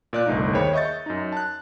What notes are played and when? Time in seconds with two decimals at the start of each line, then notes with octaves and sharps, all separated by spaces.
0.13 A#2 D5 F#6
0.26 G1 C2 A3 D#4
0.53 D#2 D#3 G#4 C5 C#5 B5
0.73 D#5 E5 C#6 G6 A6
1.06 F#2 D#4
1.32 A5 F#6